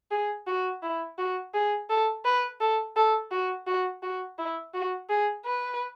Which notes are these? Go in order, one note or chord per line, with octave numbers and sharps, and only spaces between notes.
G#4
F#4
E4
F#4
G#4
A4
B4
A4
A4
F#4
F#4
F#4
E4
F#4
G#4
B4